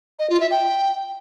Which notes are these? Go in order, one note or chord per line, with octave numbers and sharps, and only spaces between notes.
D#5
F4
E5
G5